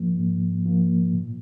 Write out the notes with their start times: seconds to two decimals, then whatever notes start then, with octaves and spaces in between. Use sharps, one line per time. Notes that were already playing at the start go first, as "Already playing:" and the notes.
Already playing: G#2 F3 A#3
0.19 G#2
0.66 F3 A#3
1.13 A#2